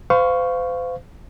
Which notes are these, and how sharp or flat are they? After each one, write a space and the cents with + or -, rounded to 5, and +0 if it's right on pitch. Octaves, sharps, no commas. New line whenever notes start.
C5 -40 F5 +0 C#6 +0